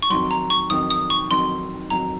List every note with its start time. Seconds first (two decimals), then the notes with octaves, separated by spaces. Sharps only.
0.02 C#6
0.10 F2 D#3 F#3 C6
0.31 A#5
0.50 C#6
0.70 F2 D#3 F#3 D#6
0.90 D#6
1.10 C#6
1.31 F2 D#3 F#3 C6
1.90 F2 D#3 F#3 A#5